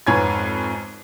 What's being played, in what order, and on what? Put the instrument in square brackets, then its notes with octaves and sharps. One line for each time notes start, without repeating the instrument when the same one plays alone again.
[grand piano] F2 G#2 B4 C#5 G#5 G#6